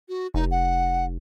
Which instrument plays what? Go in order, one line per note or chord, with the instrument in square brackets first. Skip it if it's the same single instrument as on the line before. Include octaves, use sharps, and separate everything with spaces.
[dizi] F#4
[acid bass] F1 [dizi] D#4
[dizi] F#5